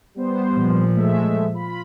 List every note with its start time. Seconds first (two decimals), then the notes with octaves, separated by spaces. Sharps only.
0.15 G3 B3 C5
0.55 A#2 F3
0.96 G#3 A3 E5
1.54 F4 B5